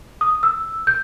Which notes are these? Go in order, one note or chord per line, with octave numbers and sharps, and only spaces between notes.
D#6
E6
G6